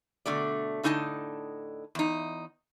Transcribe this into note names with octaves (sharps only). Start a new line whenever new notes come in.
B2 D3 A3 D5
A2 D3 D#4 D#5 G#5 A5
E2 D#4